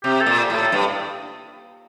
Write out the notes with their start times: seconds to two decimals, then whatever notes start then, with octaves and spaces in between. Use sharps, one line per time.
0.04 C3 G4
0.21 A4
0.26 A#2
0.38 G4
0.50 A2 A4
0.72 G2